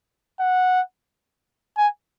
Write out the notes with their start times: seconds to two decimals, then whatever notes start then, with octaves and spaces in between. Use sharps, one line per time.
0.40 F#5
1.77 G#5